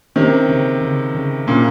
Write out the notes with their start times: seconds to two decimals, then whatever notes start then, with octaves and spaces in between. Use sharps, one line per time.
0.16 C3 D#3 C#4
0.49 C#3
0.81 C#3
1.15 C#3
1.47 A#2 C#3 A#3